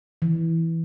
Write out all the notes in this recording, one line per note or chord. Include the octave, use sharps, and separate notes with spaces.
E3